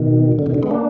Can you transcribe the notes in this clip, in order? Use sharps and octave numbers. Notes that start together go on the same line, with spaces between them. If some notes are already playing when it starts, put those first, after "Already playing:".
Already playing: B2 D#3
D3
B2 D#3
D3
G#3 B3
A#3 D4